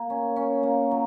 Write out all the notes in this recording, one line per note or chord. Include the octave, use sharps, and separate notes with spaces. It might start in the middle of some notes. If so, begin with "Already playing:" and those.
Already playing: A#3
C#4
C#4
A#3
F#3